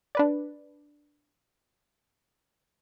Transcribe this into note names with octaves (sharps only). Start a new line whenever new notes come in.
D4 B4 D5